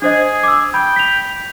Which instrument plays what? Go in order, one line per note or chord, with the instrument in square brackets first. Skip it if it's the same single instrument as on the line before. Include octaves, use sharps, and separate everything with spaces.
[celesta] D4 C5 D#5 [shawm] G#4
[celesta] D6 E6
[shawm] G5 [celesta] B5
[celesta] B6 F7